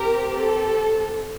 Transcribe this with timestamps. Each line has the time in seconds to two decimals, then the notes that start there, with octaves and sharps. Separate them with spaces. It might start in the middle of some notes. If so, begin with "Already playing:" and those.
Already playing: C4 G4 A#4
0.34 A4